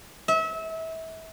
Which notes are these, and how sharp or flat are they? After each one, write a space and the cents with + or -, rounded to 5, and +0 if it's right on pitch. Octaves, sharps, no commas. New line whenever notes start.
E5 -30